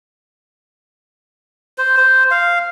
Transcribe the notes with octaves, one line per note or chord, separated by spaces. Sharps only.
C5
C5
F5